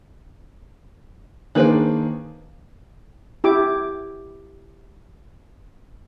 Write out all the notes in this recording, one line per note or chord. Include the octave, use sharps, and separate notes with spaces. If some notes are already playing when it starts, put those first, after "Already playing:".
D#3 A#3 D4 G#4 B4 C5
E4 G4 D6